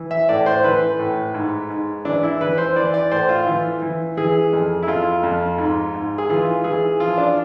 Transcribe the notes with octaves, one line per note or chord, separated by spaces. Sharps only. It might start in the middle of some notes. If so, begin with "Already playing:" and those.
Already playing: E3
E5
A2 D5
C5
E3 B4
A2
G#2
G#2
E3 D4
E4
E3 B4
C5
E3 D5
D5
A2 C5
F4
E3
E3
E3 G#4
F2
E4
F2 F4
F2
G#2
G#2
G#4
E3 F4
E3 G#4
F3 F4
D4